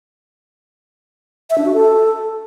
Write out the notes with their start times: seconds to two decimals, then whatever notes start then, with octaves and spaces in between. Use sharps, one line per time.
1.50 E5
1.58 D4
1.66 F#4
1.73 A4